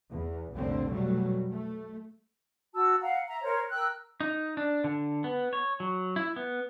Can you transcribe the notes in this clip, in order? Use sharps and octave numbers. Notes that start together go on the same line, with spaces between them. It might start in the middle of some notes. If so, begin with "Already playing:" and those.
E2
F1 C2 A#2 D3 C4
B2 F#3 G3 A3
A3
F#4 A5 E6
F5 F#5 A#5
E5 A#5
A#4 C5 C#5
A#4 G5 E6 F#6
D#4
D4
D3
B3
C#5
F#3
E4
B3